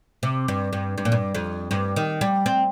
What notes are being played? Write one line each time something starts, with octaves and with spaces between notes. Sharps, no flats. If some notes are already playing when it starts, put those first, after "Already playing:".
C3
G2
G2
G2
A#2
G2
F2
G2
D#3
G3
C4